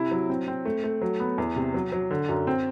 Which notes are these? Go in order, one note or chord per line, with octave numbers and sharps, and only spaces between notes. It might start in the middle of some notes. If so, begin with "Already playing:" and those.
Already playing: C3 E4
F#3
C4
C4
A3
A3
F#3
B3
E2
C3
F#3
F#3
D3
F#2
C4